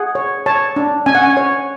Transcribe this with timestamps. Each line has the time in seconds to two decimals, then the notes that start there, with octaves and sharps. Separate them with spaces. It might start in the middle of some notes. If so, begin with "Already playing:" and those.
Already playing: G#4 F#5
0.15 C#5
0.46 C#5 A5
0.76 D4
1.06 C#4 G#5
1.15 F#5
1.23 G#5
1.37 C#5